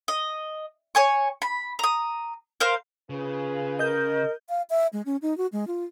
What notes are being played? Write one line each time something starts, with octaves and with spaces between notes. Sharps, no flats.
D#5
C#5 G#5 C#6
B5
A#5 D#6
A#4 C5 F5
C#3 F4 G#4 B4
A#4 D#5 G6
F5
E5
G#3
C#4
D#4
F#4
G#3
F4